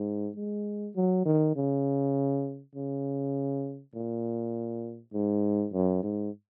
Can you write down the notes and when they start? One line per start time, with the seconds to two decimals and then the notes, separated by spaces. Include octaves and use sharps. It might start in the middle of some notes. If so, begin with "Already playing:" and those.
Already playing: G#2
0.36 G#3
0.96 F#3
1.26 D#3
1.56 C#3
2.75 C#3
3.94 A#2
5.14 G#2
5.73 F#2
6.03 G#2